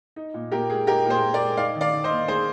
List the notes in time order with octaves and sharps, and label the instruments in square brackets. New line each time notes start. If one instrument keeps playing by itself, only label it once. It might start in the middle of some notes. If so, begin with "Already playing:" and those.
[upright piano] D#4
A#2
A#2 G4 A#4
G#3 G#4
D#4 G4 A#4
A#2
G#4 C5
A#2
A#4 D5
G#3
D#4 D5 F5
D#3
D5 F5
D#3
C5 D#5
A#3
D#4 G#4 C5